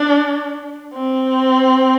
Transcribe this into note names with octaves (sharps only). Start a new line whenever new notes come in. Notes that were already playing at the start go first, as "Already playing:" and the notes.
Already playing: D4
C4